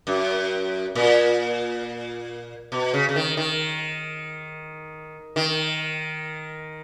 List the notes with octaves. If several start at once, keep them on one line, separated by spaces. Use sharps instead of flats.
F#2
A#2
B2
C#3
C#3
D#3
D#3
D#3